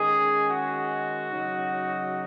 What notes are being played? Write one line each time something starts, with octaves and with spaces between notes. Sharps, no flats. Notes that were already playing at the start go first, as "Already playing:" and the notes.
Already playing: D#3 G#3 C#4 G#4
F#4
C#3 F#3 D#4